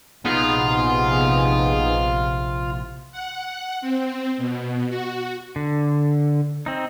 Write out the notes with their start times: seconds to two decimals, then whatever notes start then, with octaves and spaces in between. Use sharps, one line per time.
0.25 A#1 C3 B3 D#4 F4 G#4
3.12 F#5
3.81 C4
4.38 B2
4.89 F#4
5.56 D3
6.66 C4 D#4